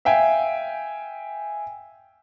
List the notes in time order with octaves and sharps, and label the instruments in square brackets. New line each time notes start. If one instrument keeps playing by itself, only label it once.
[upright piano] E5 F5 G5 G#5